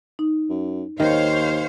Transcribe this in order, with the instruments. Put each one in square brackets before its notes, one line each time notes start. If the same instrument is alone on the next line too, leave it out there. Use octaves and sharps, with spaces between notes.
[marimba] D#4
[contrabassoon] F#2
[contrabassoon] D#2 [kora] D#3 [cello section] C5 C#5 F5